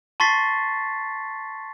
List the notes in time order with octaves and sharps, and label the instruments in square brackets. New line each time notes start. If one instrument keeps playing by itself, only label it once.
[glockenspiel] A5 C6 C#6 A6 B6 C7